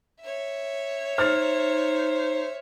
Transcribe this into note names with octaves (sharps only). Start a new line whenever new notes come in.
C#5 E5
D#4 C5 F6 A6